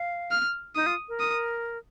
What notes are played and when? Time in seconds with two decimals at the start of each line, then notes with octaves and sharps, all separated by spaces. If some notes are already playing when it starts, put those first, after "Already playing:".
Already playing: F5
0.31 F6
0.76 D#4 D#6
0.86 F4
1.09 A#4
1.20 D#6